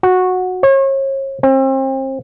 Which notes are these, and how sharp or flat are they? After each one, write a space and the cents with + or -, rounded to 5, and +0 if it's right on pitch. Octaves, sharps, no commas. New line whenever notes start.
F#4 -10
C#5 -35
C4 +35